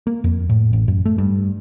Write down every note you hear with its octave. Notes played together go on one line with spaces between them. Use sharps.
A#3
F2
A2
A1
F#2
A3
G2